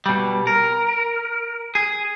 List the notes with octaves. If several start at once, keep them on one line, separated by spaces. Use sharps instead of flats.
B2 G3
A#4
G#4